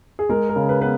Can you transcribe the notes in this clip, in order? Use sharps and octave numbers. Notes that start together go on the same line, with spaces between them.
G#4
G#3 A#4
A#4
C#3
B4
B3 B4